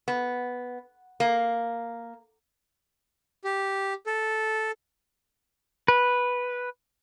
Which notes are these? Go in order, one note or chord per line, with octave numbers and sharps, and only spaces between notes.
B3
A#3
G4
A4
B4